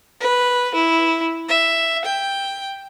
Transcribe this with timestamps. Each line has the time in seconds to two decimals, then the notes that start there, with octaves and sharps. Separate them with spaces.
0.20 B4
0.74 E4
1.49 E5
2.04 G5